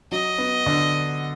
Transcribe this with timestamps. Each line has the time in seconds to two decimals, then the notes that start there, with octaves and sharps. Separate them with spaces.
0.12 F#3 D#5
0.38 B3
0.66 D3